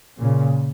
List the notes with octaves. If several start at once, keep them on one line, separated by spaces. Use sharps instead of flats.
A#2 C#3